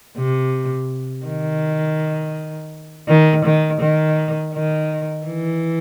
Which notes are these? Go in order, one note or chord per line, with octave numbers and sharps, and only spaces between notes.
C3
D#3
D#3
D#3
D#3
D#3
E3